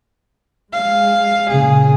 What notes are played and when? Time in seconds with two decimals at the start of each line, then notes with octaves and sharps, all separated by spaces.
0.73 G#3 F5
1.50 A#2 C#3 G#4